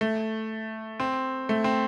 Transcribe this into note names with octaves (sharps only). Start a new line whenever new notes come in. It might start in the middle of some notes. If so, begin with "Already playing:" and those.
A3
C4
A3
C4